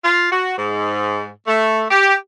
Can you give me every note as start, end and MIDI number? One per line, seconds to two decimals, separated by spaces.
0.04 0.31 65
0.31 0.56 66
0.57 1.27 44
1.47 1.84 57
1.90 2.14 67